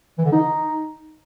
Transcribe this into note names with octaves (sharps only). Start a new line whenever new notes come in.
E3
D3
D#4